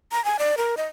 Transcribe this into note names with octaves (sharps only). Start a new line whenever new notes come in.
A#5
G#5
D5
A#4
D#5